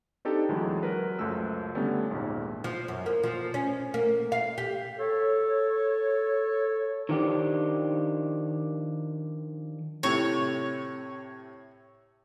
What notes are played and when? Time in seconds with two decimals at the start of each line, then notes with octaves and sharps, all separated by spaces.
0.25 C4 D4 D#4 G4 A4 G5
0.49 D2 E3 F#3 G#3
0.83 F#3 A#4 B4
1.19 C#2 F#2 F3 A3 E6
1.75 D3 G3 A3 B3 C#4
2.10 A#1 D#2 G#2
2.64 F3
2.88 F#2
3.06 A#3
3.23 F3
3.54 C#4
3.94 A#3
4.32 F5
4.58 G4
4.98 A4 C#5
7.09 D#3 F3 D4 G4
10.03 A2 C3 C#5